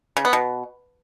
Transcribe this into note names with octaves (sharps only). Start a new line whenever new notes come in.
C#3
B3
B2